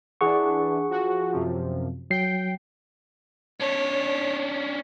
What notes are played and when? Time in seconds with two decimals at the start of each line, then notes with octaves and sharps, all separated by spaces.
0.21 E3 D4 G#4 F#5 C#6
0.89 F3 F#4
1.32 F#2 C3 F3
2.11 F#3 G5 C7
3.60 C#4 D4 C#5